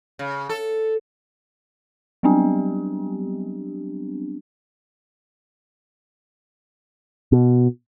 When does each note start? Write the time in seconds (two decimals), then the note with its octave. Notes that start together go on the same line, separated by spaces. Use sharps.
0.19 C#3
0.49 A4
2.23 F#3 G3 B3 C4 D4 G4
7.32 B2